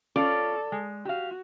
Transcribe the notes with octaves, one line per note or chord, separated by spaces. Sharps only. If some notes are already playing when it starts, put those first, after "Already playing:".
C#4 F4 A4 C#5 D5
G#3
F#4 G4 F5